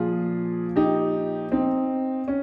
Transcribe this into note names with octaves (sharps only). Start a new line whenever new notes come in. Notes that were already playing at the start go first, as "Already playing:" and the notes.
Already playing: A#2 F3 F4 G#4
D#4 G4
C4 D#4
C#4